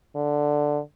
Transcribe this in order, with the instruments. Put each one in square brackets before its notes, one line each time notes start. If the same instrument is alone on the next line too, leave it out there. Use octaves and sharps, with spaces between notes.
[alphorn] D3